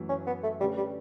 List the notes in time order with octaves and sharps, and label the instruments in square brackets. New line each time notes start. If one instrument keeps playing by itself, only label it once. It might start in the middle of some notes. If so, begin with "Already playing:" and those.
Already playing: [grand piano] F#2 E3 A3
[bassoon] C#4
B3
A3
[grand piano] D3 A3 C#4 G4 B4 [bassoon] G3
[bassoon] G3